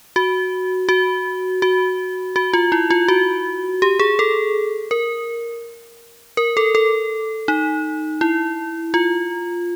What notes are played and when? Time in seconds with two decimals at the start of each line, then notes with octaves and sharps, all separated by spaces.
0.16 F#4
0.89 F#4
1.62 F#4
2.36 F#4
2.53 F4
2.72 E4
2.90 F4
3.08 F#4
3.82 G4
3.99 G#4
4.19 A4
4.91 A#4
6.37 A#4
6.57 A4
6.75 A4
7.48 D#4
8.21 E4
8.94 F4